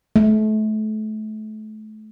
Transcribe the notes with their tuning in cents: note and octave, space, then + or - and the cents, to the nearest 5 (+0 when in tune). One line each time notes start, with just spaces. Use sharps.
A3 -30